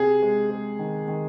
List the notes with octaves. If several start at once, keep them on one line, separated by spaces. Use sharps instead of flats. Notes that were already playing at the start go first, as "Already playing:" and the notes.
Already playing: C3 G#4
G#3
G#3
D#3
D#3